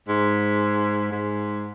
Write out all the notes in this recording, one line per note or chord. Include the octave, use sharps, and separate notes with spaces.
G#2
G#2